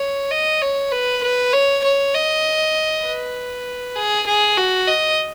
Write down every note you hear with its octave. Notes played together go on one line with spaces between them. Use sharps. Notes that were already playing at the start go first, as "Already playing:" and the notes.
Already playing: C#5
D#5
C#5
B4
B4
C#5
C#5
D#5
B4
G#4
G#4
F#4
D#5